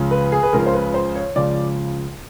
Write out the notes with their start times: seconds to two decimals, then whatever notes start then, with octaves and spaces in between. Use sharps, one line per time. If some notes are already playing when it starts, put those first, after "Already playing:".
Already playing: C#2 C#3 F3
0.11 B4
0.32 G#4
0.43 B4
0.53 C#2 C#3 F3 A#4
0.66 C5
0.74 B4
0.94 C5
1.15 C#5
1.36 C#2 C#3 F3 D5